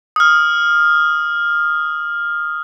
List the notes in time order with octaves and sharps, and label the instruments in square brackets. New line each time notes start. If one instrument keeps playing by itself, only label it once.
[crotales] D#6 F6